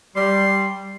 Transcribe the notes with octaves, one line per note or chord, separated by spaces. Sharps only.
G3 C6